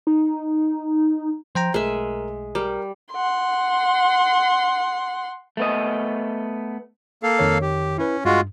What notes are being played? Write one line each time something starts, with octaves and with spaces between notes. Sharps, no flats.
D#4
F3 C5 G5 A#5
B1 G#3 A3 A#4 E5
G3 A#4
F#5 C6
A3 B3 D#5
A#3 A4 F5
F2 D#3 C#5
G4
C#4 E4 B4
G2 G#3 F4 F#4